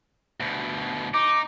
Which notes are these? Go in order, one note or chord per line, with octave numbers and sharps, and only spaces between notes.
D2 B2
D#4 D6